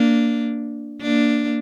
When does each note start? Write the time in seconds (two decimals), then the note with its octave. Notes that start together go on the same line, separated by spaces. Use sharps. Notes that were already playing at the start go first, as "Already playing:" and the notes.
Already playing: A#3 D4
1.02 A#3 D4